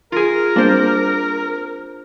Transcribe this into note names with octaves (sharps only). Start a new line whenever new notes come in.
F4 G#4 A#4
G3 A#3 C4 D4 C5